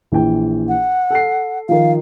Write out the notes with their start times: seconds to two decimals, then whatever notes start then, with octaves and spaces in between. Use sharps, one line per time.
0.12 A#1 E3 G5
0.68 F#5
1.10 A4 C7
1.69 D#3 F3 F5